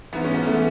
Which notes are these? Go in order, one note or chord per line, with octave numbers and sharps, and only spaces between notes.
G#2 E3 B3
C#4
B3
E3 A3